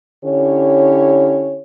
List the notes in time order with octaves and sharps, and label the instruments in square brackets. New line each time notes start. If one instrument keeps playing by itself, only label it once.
[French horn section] D3 C#4 E4 G4 C#5